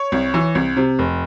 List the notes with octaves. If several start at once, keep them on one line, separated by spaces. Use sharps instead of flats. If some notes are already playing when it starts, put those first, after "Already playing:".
Already playing: C#5
C2
E3
C2
C3
F1